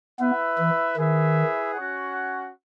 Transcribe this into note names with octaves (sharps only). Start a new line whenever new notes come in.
B3 E4 B4 E5
E3
D#3 E4 G#4 B4 E5
C#4 F#4 C#5 F#5